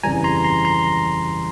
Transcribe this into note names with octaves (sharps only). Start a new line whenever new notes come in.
G1 F2 C#3 E3 G3 G#5 A#5
A#5 C6
A#5 C6
A#5 C6